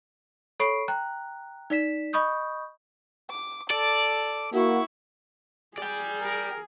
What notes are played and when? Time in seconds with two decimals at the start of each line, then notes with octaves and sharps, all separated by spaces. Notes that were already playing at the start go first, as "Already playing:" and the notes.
0.60 A4 C#5 B5 C#6 C7 D7
0.88 G5 A#5 F#6
1.70 D#4 D5 B6 E7
2.13 D#5 B5 C#6 D#6 G6
3.30 D6
3.71 A4 D5
4.53 A#3 E4 F#4 C#6
5.78 G#4 D5 G5
6.20 A#4